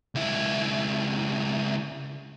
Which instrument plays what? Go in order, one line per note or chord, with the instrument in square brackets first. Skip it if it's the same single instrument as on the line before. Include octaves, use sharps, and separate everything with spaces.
[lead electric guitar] C#2 E4